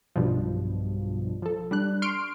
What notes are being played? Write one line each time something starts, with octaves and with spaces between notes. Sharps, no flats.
B1 G2 B2 F3
F3 A4
G3 D4 F#6
C6 C#6 F6 C7 D7